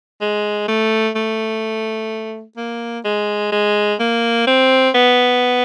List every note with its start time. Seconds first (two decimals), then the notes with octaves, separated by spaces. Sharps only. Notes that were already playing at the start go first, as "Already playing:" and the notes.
0.21 G#3
0.68 A3
1.15 A3
2.57 A#3
3.05 G#3
3.52 G#3
4.00 A#3
4.47 C4
4.94 B3